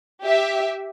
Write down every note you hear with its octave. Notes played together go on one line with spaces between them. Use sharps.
G4 E5